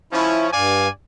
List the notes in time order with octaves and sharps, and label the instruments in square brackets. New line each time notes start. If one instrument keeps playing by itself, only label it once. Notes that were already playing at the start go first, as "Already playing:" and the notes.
[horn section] F3 C#4 [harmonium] E4
[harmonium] G2 [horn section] D5 F5 G#5